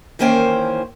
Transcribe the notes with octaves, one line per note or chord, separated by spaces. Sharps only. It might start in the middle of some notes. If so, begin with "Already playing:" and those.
D#3 E3 A#3 C#4 C5 G5